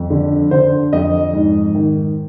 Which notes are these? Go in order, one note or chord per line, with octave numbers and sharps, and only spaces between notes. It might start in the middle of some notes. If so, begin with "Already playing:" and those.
Already playing: F2
D3
D3 C5
F2 D#5
G#2
D#3